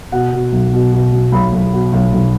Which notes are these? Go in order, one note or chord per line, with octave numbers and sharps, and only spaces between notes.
B2 F#5
B2
B1
B2
B2
F#3
B1 B5
B1
B2
B1
B1